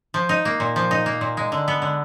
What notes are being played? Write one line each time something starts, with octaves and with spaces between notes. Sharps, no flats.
F3
D#4
A#3
A#2
F3
D#4
A#3
A#2
G#3
D3
B3
D3